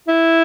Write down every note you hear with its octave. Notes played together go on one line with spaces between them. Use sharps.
E4